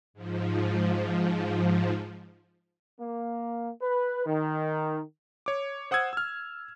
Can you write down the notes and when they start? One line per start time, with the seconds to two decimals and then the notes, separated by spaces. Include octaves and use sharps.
0.13 G#2 F3
3.00 A#3
3.82 B4
4.26 D#3
5.46 C#5 D6
5.91 C5 F#5 D#6 E6 G#6
6.13 E6 F6